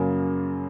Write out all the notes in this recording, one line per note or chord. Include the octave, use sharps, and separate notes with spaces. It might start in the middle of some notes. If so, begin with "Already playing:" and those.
Already playing: F#2 C#3 F#3 A#3